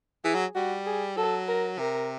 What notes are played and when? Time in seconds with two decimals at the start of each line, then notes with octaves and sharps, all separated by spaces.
0.24 E3 G#4
0.35 F#3
0.55 G3 F#4
0.86 G#4
1.17 F#3 A4
1.48 A#4
1.79 C3 A#4